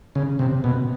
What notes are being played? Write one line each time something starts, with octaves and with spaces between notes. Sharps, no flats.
C#3
C3
B2